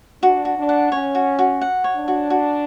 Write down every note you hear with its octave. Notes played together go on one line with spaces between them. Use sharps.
D4 F#4
F#4
D4
F#5
C#4 C#5
F#4
F#4
F#5
C#5
D4
F#4
F#4